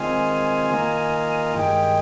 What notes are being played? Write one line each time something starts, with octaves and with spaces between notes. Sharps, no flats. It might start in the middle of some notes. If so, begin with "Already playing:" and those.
Already playing: D#3 G#3 C4 F4 G#5
D#3 A#3 F4
G#5
G2 D#3 G#3 G5